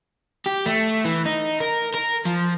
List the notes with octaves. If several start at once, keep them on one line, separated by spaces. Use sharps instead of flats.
G4
A3
E3
D#4
A#4
A#4
F3